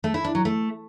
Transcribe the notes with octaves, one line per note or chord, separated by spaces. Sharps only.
A3
E4
D4
F#3
A3